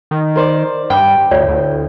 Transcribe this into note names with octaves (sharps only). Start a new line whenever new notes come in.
D#3
A#4 C5 D5
G2 G5 B5 D6
D2 A2 F4 C#5 D5
D2